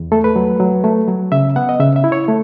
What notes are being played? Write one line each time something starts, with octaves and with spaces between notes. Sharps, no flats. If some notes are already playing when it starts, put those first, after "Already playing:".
Already playing: E2
A3 A4
B4
F#3
F#3
A3
F#3
C#3 E5
B3 F#5
D#5
C#3 E5
E5
E4
C#5
A3